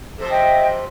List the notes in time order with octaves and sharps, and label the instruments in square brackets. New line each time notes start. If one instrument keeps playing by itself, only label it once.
[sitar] C3 F3 C5 [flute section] A4
[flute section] D#5 E5 G5